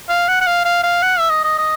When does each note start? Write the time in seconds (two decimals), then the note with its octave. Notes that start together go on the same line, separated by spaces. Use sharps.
0.09 F5
0.28 F#5
0.41 F#5
0.47 F5
0.65 F5
0.83 F5
1.02 F#5
1.19 E5
1.30 D#5
1.44 D#5
1.58 D#5